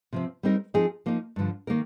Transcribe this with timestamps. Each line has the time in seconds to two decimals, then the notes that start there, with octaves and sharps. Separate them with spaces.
0.13 C3 F3 C4
0.43 G3 C4 D#4 A#4
0.74 F3 C4 D#4 G#4
1.06 F3 A#3 D#4
1.36 G2 D3 F3
1.67 D#3 A#3 D#4 A#4